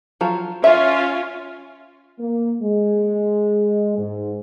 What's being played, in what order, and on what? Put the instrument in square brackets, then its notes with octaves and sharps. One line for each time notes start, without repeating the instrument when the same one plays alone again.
[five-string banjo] F3 F#3 F4
[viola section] C#4 F4 [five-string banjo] E5
[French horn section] A#3
G#3
G#2